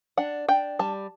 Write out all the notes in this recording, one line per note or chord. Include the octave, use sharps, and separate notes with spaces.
D4 F#5
D4 G5
G3 A5